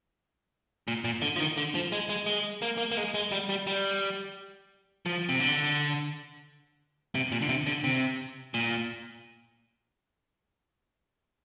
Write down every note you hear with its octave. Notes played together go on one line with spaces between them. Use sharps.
A#2
A#2
D3
F3
D#3
D3
F3
G#3
G#3
G#3
A#3
A#3
A#3
G#3
G#3
G3
G3
G3
F3
C3
D3
C3
A#2
D3
C3
D3
C3
A#2